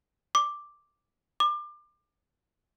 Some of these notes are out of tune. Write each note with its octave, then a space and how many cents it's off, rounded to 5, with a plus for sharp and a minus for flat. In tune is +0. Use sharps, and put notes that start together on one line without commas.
D6 +0
D6 +30